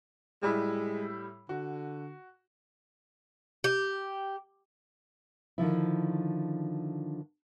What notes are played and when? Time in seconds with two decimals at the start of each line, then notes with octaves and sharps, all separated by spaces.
0.42 A2 G3 G#3 E4
1.49 D3 F#4
3.64 G4
5.58 D3 D#3 F3 E4